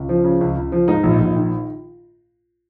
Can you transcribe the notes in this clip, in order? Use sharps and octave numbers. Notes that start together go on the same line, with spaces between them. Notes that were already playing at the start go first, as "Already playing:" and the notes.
Already playing: C#2
F3
C#3
C#2
C#2
F3
G#2 D#4
A#1
A#1
D#3